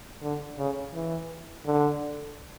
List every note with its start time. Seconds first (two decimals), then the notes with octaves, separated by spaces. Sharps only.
0.22 D3
0.58 C#3
0.94 E3
1.66 D3